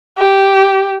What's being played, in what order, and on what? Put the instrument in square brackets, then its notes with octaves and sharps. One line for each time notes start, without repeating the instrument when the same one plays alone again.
[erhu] G4